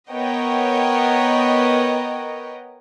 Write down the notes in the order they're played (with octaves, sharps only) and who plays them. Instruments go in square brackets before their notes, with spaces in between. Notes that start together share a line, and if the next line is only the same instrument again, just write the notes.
[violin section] B3 A#4 C#5 D#5 F#5 G5